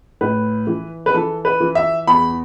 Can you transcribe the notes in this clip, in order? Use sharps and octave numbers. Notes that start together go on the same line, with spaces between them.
A2 B4
E3
B4
E3 A4
B4
E3
E5
E2 B5